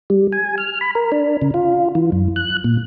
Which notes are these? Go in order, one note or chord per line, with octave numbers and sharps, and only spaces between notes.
G3
G#5
F6
B5
A#4
D4
C#3
F4
E3
F#2
F#6
A#2